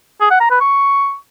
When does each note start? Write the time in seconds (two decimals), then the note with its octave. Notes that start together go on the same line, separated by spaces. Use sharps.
0.21 G#4
0.31 F#5
0.41 A#5
0.51 B4
0.61 C#6